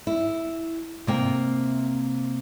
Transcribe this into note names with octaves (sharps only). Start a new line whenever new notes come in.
E4
C3 A#3 G5